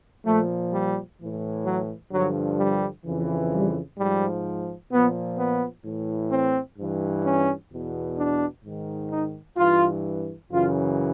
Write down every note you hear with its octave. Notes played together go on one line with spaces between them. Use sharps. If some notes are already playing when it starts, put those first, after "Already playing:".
A#2 F3 A3
G3
A2 E3
F#3
G2 D3 F3 F#3
G3
F2 C#3 E3
G3
G#2 F3 G3
A#2 F3 B3
B3
A2 E3
C4
G2 E3
C#4
E2 B2
D4
G#2 D#3
D#4
G2 E3 F4
F#2 C#3 E3 F4